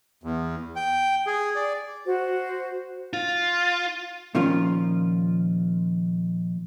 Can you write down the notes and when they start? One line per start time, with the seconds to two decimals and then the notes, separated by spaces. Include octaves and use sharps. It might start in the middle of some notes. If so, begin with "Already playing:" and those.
0.24 E2
0.76 G5
1.27 G#4
1.55 D5
2.05 F#4 C5
3.13 F4
4.35 A#2 D#3 F3 C#4 F4